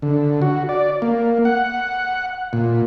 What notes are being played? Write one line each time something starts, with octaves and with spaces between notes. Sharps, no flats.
D3
F#4
D5
A#3
F#5
A#2